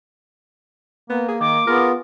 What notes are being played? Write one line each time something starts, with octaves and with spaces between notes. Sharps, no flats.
A#3 B3
G#4
D#3 D6
B3 F4 G#4 A#4